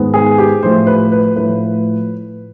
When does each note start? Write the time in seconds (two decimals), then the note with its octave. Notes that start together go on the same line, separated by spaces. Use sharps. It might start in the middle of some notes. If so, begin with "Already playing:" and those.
Already playing: G#2 D#3 G#3 B3
0.14 G#4
0.38 G4
0.63 A2 F3 A3 C5
0.87 B4
1.12 B4
1.36 A2 F3 A3 B4